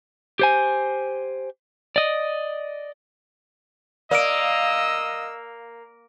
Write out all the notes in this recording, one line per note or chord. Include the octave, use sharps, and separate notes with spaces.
G4 C5 G#5
D5 D#5
A#3 D5 D#5 E6 D7